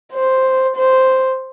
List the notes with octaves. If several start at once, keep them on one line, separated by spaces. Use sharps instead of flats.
C5
C5